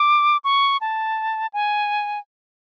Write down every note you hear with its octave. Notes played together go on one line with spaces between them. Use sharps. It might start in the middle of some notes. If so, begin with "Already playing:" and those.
Already playing: D6
C#6
A5
G#5